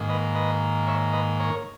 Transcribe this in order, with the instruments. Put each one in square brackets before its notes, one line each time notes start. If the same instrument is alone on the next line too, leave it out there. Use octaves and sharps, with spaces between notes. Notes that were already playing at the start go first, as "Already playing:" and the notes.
Already playing: [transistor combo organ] G#2 D#3 A#3
B4 D#5
B4 D#5
C#5 E5
B4 D#5
A#4 C#5